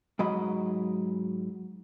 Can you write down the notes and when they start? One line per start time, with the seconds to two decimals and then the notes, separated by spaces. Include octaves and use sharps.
0.19 G#2 F#3 D#5 B5